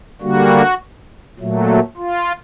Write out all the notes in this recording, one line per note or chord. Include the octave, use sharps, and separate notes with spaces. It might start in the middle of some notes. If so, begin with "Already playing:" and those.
D3 G3 A#3 F#4
A#2 F#3 A3
F4